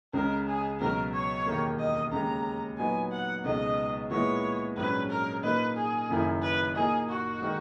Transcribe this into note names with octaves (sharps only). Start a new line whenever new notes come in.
C#2 C#3 G#3 A#4
G#4
C#2 B2 F#3 A#4
C#5
E1 D#2 D#3 A#3
D#5
D#2 C#3 G#3 A#5
A#2 F#3 B3 D#4 G#5
F#5
C#2 B2 G#3 D#4 D#5
A#2 G#3 B3 E4 C#5
A#1 G#2 F#3 C#4 B4
A#4
A#2 A#3 D#4 B4
G#4
F#1 F#2 D#3 A#3 E4
B4
A#2 A#3 D#4 G#4
F#4
D#3 G#3